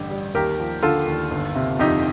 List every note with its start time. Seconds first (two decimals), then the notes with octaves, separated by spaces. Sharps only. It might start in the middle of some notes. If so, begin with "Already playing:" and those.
Already playing: A1 G2 D3 G4
0.10 G3
0.34 D#2 G4 A#4
0.59 F3
0.83 D3 F4 A4
1.07 D#2
1.31 G1
1.55 C3
1.79 F2 D#4 G4